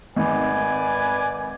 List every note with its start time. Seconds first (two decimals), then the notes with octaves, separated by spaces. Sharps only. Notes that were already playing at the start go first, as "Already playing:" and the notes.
0.16 G#1 B4 D5 G#5